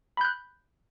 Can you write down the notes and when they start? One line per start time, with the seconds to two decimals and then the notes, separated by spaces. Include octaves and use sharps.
0.17 B5
0.21 G6
0.25 F#6